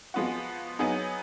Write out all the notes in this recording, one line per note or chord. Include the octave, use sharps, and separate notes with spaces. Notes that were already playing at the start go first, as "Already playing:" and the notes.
F3 G#3 B3 F#4
F#3 B3 D#4 G#4